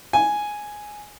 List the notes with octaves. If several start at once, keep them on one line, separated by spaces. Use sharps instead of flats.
G#5